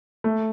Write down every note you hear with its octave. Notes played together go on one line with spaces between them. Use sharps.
A3